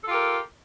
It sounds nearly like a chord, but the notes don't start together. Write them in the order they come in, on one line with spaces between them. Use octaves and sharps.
A4 F4 G4 A#4